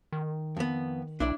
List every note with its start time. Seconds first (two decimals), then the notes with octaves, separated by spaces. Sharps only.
0.12 D#3
0.57 F2 B3
1.20 B1 D4 E4 D5